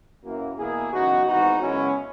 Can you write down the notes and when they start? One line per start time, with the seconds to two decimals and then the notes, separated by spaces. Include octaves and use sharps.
0.23 F#2 E3 A#3
0.57 E2 B2 A#3 E4 G#4
0.92 F#2 C#3 E3 B3 D#4 F#4
1.26 G#1 G#2 E3 B3 D#4 F#4
1.60 F#2 C#3 G#3 B3 C#4 E4